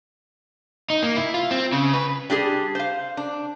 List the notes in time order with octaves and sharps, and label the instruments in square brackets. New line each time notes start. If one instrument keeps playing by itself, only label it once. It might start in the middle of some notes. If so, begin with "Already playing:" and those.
[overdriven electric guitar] D#4
A#3
E4
F4
C4
C#3
B4
[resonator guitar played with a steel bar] G3 D4 G4 G#4
C5 F5
D4